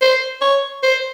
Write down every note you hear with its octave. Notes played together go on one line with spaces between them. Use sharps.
C5
C#5
C5